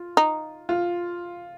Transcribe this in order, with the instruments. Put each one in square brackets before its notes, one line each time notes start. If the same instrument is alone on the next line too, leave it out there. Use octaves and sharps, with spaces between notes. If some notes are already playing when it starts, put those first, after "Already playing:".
Already playing: [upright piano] F4
[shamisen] D#4
[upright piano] F4